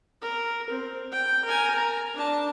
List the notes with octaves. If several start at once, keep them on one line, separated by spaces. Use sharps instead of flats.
A#4
C4
G5
A#4 G#5
A#5
D4 A5